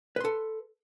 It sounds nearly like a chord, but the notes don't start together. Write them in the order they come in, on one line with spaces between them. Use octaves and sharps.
B4 C6 A4